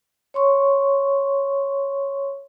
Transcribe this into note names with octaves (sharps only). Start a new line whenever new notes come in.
C#5 C6 C#6